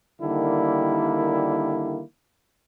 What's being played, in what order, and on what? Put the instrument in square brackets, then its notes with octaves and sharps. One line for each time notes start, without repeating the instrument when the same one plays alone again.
[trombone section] D3 D#3 G3 A#3 E4